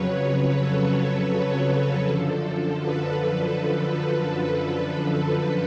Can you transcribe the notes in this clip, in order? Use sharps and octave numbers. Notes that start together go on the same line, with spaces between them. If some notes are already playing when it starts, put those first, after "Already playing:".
Already playing: F2 C#3 F#3 B4 C#5
A4
A4
F#2 D3 F3
B4